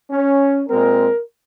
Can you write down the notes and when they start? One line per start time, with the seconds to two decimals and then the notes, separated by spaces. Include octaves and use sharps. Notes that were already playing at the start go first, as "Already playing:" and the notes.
0.10 C#4
0.68 A#2 G#3 C4 A#4